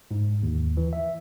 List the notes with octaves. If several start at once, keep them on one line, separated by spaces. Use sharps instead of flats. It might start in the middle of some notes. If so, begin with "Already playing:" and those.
G#2
D#2
E3
E5